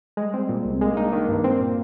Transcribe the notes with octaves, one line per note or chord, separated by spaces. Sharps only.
G3 G#3
C4
A#2
C2
C4
G#3 A#3
D4
D#4
D#3 D4
G2
C4
A#2